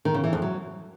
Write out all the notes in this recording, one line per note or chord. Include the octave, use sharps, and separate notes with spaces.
D#3
C#3
E3
F2
F#3